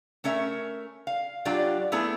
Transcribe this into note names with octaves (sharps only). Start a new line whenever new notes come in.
A3 C#4 A#4 E5
F5
F#3 D4 F4 G4 D5
A3 B3 E4 G#4